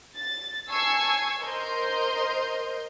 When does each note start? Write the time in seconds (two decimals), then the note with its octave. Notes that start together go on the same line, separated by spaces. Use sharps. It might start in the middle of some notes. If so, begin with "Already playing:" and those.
0.16 A6
0.69 G#5 A5 C#6 E6 G#6 C7
1.42 A#4 C5 D#5 C6 G6